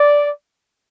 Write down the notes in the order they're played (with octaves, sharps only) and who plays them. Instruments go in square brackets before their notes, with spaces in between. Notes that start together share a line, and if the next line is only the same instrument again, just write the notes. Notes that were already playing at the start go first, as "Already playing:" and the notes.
Already playing: [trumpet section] D5